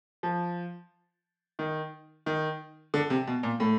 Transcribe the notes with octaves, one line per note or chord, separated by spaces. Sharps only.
F3
D#3
D#3
D3
C3
B2
A#2
A2